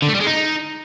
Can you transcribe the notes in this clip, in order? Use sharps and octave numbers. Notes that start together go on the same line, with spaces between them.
D3
A3
G3
G#3
D#4